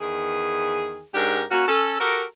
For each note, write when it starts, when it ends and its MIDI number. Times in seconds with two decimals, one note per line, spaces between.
0.01 1.02 40
0.01 1.02 51
0.01 1.02 68
1.14 1.43 44
1.14 1.43 61
1.14 1.43 62
1.14 1.43 67
1.14 1.43 70
1.51 1.66 58
1.51 1.66 61
1.51 1.66 66
1.68 1.96 61
1.68 1.96 69
2.00 2.23 66
2.00 2.23 67
2.00 2.23 69
2.00 2.23 70